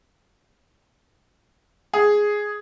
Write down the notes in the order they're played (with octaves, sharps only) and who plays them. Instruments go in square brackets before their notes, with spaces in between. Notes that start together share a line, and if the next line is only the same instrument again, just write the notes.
[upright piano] G#4